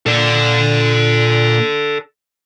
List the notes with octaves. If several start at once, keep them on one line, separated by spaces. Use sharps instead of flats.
A#2 A4 D5